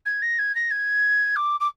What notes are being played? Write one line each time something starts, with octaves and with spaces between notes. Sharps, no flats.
G#6
A#6
G#6
A#6
G#6
D6
D6